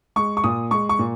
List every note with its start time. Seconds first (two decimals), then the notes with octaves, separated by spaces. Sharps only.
0.16 G#3 C#6
0.37 C#6
0.44 A#2 D#6
0.71 G#3 C#6
0.89 C#6
0.99 A#2